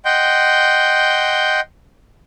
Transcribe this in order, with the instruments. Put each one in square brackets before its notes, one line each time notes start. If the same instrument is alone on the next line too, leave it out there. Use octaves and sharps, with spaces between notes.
[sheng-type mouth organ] D#5 F#5 G5 C6 G6